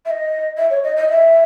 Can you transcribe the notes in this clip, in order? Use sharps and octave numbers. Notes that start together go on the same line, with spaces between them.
E5
D#5
E5
C#5
D#5
D#5
E5